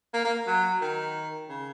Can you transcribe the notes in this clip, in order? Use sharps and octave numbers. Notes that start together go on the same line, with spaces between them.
A#3
A#3
F#3
D#3
C#3